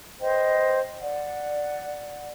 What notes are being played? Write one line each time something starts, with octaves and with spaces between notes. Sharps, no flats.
B4 C5 D#5 G5
D5 F#5